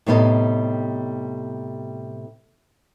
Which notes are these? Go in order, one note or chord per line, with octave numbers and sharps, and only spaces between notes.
A2 C3 G3 B3 D4 D#4